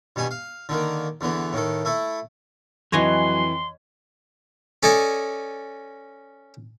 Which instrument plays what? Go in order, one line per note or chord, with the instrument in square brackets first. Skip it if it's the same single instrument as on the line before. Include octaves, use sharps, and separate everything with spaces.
[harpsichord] G2 B2 G4 G#5
F5
D3 D#3 A#3
E2 D3 E3 B3
A2 D#3 A4
A3 E4 A4
[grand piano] F2 E3 [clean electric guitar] F#3 [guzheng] C#5 D#5 G#5 [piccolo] C6
[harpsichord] C#4 A4 D5 D#5 G#5